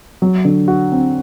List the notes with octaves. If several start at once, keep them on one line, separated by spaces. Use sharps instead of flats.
F#3
D3
F#4
C4